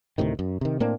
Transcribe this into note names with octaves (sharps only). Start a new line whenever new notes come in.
D2 A2 C3 D#3
F#2
C3 D#3
A2 A#3 C4 D4